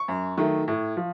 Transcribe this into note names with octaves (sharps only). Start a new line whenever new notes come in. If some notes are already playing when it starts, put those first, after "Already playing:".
Already playing: C#6
F#2
D#3 F#3 A3
A2
F3